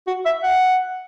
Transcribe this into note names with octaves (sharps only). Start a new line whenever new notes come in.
F#4
E5
F#5